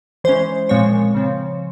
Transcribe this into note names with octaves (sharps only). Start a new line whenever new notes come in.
E3 G#3 C#4 C5
A#2 F3 G#3 C4 C#5
C#3 F3 C4